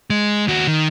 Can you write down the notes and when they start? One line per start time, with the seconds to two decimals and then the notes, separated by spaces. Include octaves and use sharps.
0.10 G#3
0.47 D#2 F#4
0.67 D#3